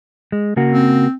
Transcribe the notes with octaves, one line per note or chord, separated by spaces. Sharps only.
G#3
C#3 A#3 F#4
C4